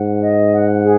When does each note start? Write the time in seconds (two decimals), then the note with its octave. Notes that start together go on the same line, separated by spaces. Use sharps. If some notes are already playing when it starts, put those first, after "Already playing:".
Already playing: G#2 F#5
0.21 D#5
0.52 F#5
0.82 G#4